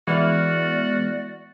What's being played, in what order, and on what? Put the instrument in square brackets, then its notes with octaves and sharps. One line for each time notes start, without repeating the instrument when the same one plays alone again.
[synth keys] E3 [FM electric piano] G#3 B3 F6 [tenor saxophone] F#4 [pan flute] D5